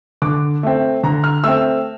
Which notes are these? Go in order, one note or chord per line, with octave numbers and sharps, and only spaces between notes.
D3 D6
A3 C4
D3 A#5
F6
A3 C4 E6